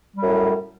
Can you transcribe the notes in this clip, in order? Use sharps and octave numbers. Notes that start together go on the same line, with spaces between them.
F#2 A2 G3